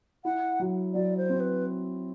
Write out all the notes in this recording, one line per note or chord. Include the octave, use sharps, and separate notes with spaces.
E4 F#5
F#3
F#3 D5
C5
C4
B4